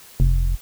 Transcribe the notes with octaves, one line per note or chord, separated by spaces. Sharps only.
F1